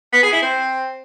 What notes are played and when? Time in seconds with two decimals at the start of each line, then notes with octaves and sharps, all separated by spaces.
0.13 B3
0.23 G#4
0.32 E4
0.42 C4